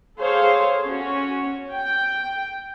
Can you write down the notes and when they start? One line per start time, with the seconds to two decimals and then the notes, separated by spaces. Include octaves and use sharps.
0.19 G#4 A4 C5 C#5 F5
0.86 C#4 F#4 C#5
1.72 G5